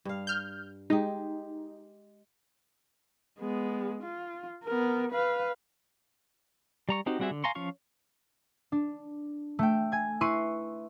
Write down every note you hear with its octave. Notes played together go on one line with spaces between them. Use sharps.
G2 F5
F6 G6
G#3 D#4 G4
G#3 B3
F4
B3 A#4
B4 F5
G3 A#5 C#6
C4 D#4 F#4 G4
G3 C4 F#4 G#4 E5
D3
F5 G#5 A#5 C6 C#6
F3 C#4 F4 F5 C#6
D4
A3 G5
G#5 G#6
E4 B4 C6 C#6 C7 D#7